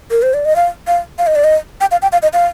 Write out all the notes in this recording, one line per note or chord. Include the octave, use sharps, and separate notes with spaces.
A#4
C5
D5
D#5
F5
F5
F5
D#5
D5
D#5
G5
F5
G5
F5
D#5
F5